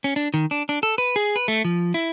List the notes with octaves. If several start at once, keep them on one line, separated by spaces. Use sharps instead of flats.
C#4
D4
D#3
D4
D4
A4
B4
G#4
B4
A3
F3
E4